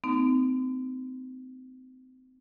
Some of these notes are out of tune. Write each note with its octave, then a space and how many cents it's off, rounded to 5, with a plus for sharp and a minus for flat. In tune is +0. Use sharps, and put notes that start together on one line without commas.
A3 +40 C4 -30 D#4 +0